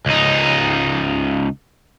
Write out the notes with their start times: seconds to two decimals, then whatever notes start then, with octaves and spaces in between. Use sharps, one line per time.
0.06 C#2 D#4